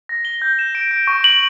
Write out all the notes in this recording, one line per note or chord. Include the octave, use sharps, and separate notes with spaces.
A#6
G7
G6
E7
D7
D7
C#6
F#7